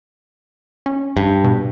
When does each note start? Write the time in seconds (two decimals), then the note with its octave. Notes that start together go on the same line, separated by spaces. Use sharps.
0.86 C#4
1.17 G2
1.44 B2